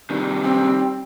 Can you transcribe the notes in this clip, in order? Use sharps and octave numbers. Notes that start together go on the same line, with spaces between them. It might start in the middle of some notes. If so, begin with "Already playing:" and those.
C3 D#3 G3
C4